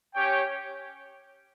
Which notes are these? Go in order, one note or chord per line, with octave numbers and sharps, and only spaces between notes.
C#4 G4 C#5 G5